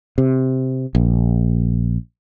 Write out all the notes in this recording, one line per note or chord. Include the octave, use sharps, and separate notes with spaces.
C3
A#1